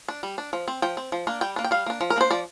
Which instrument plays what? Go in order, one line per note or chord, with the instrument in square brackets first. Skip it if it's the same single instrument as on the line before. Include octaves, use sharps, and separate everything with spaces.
[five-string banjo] D4
G3
D4
F3
C4
F3 G5
C4
F3
A#3 D4
G3 G5
A#3 D4
G5
G3 F5
A#3 D4
F3
A#4
A#3 D4 C5
F3 D5